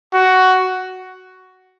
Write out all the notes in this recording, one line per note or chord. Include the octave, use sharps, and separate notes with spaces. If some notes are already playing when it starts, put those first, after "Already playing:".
F#4